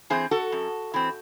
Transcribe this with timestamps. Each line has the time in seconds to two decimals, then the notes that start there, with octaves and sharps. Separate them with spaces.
0.10 E3 C4 G#4 C5
0.31 F#4 A4
0.52 F#2
0.94 E3 C4